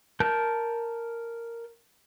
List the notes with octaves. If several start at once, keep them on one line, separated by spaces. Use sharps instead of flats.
A#4 A5 G6